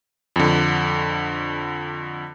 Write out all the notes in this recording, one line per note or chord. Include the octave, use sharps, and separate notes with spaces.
F2 D3